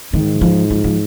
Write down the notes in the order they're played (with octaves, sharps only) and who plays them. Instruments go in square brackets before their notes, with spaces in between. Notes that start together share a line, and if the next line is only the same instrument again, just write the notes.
[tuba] G#2 [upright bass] D#3
[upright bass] F3
F3
F3